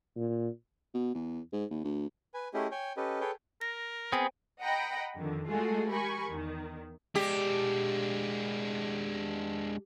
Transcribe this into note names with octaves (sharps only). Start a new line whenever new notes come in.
A#2
B2
E2
G#2
D#2
D2
B4 G#5
A3 C#4 E4 G4 G#4 D#5
C#5 G5 G#5
C#4 G4 A4 B4 D#5
G#4 A4 B4 C#5 G5
A#4 A#6
B3 C4 G#4 C5 G5 G#5
D#5 F#5 G5 A#5 B5
F2 D3 D#3
G#3 A3 F4 F#4 G#4 A4
G4 A#4 G#5 B5 C#6
E2 D#3
G#3 D4 G4